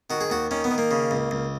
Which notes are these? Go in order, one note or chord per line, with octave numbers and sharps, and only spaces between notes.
D#3 F#4
G#4
D#2 F#4
D#3 C#4
B3
D#3
A#3
C#3
C#2
C#2